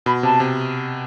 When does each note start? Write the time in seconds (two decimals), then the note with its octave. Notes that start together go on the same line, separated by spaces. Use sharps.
0.06 B2 B5
0.23 C3 A5
0.40 C3